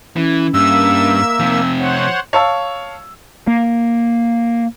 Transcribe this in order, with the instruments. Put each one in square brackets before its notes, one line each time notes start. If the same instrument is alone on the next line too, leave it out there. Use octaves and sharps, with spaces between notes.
[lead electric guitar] E3 [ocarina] C#4
[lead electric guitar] G2 [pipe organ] A#3 E5 [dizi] E6
[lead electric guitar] C3 F3 [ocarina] C4
[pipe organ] C5 C#5 F#5
[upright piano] C#5 F5 A5 E6
[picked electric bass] A#3